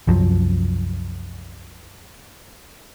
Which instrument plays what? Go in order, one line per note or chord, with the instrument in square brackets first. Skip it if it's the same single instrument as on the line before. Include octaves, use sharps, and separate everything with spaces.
[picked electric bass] C2 F#2 F3 F#3